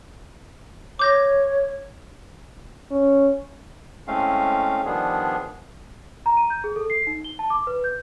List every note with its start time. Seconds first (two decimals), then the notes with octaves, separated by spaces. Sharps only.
0.99 C#5 D6 G6 A#6
2.91 C#4
4.07 A2 G#3 A3 C4 C#4 F5
4.86 D#3 F3 G3 B3 D4 G#4
6.26 A#5
6.37 D#7
6.50 G6
6.64 G#4
6.76 A4
6.90 C7
7.07 D#4
7.24 G7
7.39 A5
7.50 D6
7.67 B4
7.84 G6